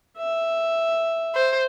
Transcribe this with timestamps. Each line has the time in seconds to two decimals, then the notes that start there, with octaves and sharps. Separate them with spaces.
0.17 E5
1.35 C5